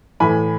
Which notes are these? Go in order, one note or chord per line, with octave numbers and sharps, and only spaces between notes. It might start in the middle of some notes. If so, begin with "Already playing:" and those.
A2 E3 G#5 B5